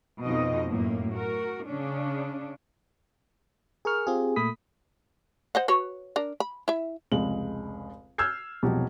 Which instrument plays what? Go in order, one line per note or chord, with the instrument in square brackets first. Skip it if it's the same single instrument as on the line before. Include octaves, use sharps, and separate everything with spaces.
[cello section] F2 B2 D#4 D#5
F#2 A2 A#3
F#4 A#4
C#3 C#4 D4
[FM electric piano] G#4 A#4 C#6 F6
C4 F4 G4 G#4
A#2 A3 B5 D#6 B6
[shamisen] C5 D#5 F#5
F#4 B4 C#5
D4 A#4
B5
E4 E5
[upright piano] F1 C#2 G#3 F#7
E6 F6 G6 G#6 C7
E1 C2 B2 F3 F#3 G4